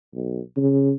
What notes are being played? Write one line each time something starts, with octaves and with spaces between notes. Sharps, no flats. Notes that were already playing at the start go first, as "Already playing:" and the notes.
B1
C#3